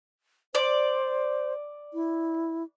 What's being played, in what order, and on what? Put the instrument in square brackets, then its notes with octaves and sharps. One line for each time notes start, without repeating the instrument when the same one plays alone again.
[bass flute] C5 [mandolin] D5
[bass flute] E4